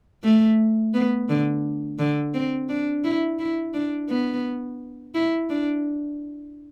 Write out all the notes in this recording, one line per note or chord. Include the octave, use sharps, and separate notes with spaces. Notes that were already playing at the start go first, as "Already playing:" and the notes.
A3
B3
D3
D3
C4
D4
E4
E4
D4
B3
E4
D4